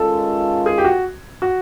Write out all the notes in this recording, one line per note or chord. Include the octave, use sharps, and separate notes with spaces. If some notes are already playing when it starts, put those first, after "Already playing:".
Already playing: D#3 G#3 C#4 F4 A4
G#4
G4
F#4
F#4